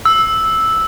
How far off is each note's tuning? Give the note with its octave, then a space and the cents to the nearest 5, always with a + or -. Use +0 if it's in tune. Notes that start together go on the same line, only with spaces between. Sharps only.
E6 -5